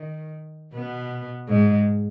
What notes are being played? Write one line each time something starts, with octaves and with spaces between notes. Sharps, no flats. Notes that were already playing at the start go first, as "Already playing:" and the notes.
Already playing: D#3
B2 B3
G#2 G#3